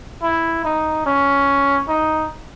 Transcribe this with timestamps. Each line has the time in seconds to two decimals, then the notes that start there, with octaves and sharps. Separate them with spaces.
0.23 E4
0.65 D#4
1.06 C#4
1.89 D#4